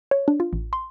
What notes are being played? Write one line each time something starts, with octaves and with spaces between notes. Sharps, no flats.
C#5
D4
F4
A1
C6